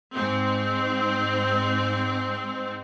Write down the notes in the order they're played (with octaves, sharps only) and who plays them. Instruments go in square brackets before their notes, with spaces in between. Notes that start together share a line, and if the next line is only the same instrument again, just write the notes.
[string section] G#2 C4